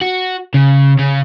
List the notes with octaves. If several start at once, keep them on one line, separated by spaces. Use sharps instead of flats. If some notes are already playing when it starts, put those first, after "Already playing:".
F#4
C#3
C#3